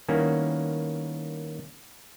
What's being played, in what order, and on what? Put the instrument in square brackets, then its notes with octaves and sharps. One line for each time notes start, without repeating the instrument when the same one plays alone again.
[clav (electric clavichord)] D#3 G3 A#3 B3 C#4 E4